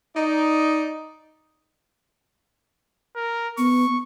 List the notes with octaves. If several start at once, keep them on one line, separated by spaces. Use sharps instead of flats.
D#4 D5
A#4
B3 C#6